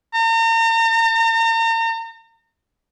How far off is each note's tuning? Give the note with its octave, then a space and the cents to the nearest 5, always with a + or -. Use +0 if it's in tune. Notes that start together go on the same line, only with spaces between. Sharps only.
A#5 -40